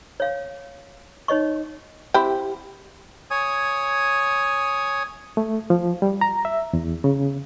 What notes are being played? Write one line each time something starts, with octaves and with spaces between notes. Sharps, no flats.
C#5 F5
D#4 C#5 D#5 C#6
C4 E4 G4
C#5 G#5 D#6
A3
F3
G3
A#5
E5
E2
C#3